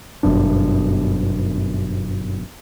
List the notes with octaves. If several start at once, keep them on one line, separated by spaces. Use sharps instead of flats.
G1 F#2 B2 D4